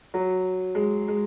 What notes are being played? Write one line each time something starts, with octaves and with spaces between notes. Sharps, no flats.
F#3
G#3
G#3